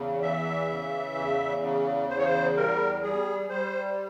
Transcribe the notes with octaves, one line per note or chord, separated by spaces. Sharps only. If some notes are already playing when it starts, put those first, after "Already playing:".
Already playing: E2 C#3
E3 E5
C#3
E2
C#3
E2 C5
C#5
C5
G3 A#4
G3 G#4
G3 C5